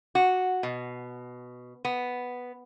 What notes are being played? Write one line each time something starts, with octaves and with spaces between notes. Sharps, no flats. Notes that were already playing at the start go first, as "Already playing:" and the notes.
F#4
B2
B3